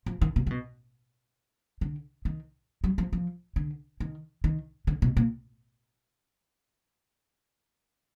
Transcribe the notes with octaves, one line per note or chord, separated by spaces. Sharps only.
F3
D#3
B2
D3
B2
D3
D#3
F#3
F3
F3
D3
D#3
D#3
D3
B2
A#2